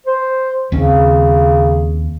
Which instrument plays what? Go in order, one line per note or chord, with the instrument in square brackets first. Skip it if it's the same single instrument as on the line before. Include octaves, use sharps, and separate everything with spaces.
[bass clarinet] C5
[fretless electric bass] D#2 C4 C#4 [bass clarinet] C#3